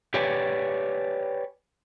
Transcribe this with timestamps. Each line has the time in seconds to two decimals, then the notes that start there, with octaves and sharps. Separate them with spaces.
0.14 G4 B4 C#5 D5 G#5